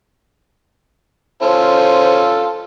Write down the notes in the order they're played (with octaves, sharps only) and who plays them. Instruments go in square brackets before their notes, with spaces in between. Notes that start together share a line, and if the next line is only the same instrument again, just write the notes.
[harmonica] C#4 F4 A4 [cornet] C5